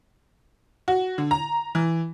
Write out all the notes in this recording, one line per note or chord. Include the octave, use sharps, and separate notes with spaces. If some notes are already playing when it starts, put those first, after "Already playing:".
F#4
D3
A#5
E3